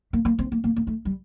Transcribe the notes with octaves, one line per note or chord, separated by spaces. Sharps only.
A#3
A#3
C4
A#3
A#3
A#3
A3
G3